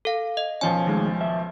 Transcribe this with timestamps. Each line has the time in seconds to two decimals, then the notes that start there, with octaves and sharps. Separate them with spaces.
0.05 A4 F5
0.37 D#5
0.61 B1 F3 C#4 G#5
0.87 D#3 G#3 A3
1.21 E5